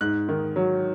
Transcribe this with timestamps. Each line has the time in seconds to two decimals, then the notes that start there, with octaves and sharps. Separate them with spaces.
0.01 G#2 F#6
0.29 D#3
0.56 F#3